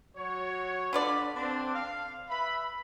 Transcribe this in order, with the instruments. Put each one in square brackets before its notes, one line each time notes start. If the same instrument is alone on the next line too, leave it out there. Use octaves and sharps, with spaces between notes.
[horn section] F#3 F#4 C#5
[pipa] D3 F4 D5 [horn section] B4 B5
[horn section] C4 D4
F5
B4 E5 B5